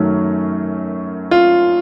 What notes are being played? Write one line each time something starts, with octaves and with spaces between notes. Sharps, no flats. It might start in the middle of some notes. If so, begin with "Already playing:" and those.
Already playing: F#2 D#3 F#3 A3 C#4
F4